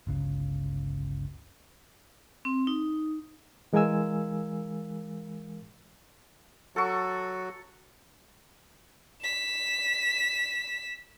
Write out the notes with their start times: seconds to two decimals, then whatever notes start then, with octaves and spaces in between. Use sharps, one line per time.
0.07 G1 C#2 C#3
2.45 C4
2.67 D#4
3.73 E3 G#3 A#4 F5 G#5 E6
6.76 F#3 F#4 A4 C#6
9.23 B6 E7